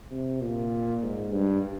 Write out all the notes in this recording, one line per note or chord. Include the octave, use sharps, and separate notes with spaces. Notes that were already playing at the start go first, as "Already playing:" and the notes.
C3
A#2
G#2
G2